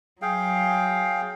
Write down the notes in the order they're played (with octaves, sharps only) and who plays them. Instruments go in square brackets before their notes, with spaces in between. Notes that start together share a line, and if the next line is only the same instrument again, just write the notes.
[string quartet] F#3 [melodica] G#4 F5 G5